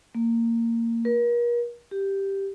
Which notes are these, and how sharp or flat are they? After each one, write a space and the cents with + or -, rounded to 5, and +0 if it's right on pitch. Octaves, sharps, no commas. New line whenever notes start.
A#3 -20
A#4 +40
G4 +0